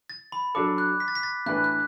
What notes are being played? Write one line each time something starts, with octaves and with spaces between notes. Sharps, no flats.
A6
B5
F#3 D4 A4 D6
F#6
B6
A6
B6
A6
A2 E3 D4 B4 F#6
F#6